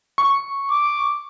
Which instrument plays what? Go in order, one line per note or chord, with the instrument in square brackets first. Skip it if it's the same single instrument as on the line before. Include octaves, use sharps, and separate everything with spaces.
[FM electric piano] C#6
[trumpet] D6